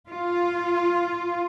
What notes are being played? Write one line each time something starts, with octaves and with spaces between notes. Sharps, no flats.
F4